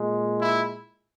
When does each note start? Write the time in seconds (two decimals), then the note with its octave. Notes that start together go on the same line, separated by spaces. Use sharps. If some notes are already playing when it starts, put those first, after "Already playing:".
Already playing: A#2 G#3
0.41 E4